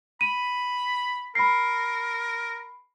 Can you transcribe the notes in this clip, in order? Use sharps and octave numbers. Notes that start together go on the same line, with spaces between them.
B5 D#7
A#4 B5 C7